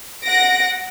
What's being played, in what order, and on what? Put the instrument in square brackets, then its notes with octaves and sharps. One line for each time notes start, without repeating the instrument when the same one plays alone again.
[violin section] F#5 A#6 D7